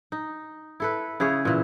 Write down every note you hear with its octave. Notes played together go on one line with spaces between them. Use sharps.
D#4
E4 A4 B4
C#3 E4 G#4 C#5
A#2 E3